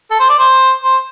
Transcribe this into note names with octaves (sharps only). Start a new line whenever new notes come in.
A4
C5
D5
C5
C5